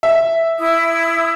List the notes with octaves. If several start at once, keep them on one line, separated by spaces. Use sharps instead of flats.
E5
E4 D#6 E6